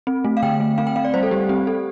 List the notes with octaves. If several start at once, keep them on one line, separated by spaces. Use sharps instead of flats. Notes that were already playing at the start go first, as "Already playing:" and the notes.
C4
A3
F5
D3 G5
A3
C4 F5
G5
C4 F5
D5
G3 C5
A4
G3 G4
C4 G4
C4 A4